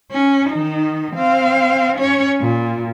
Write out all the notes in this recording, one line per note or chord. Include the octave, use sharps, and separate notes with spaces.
C#4
D#3 D#4
C4 F5
C#4 C#5
A#2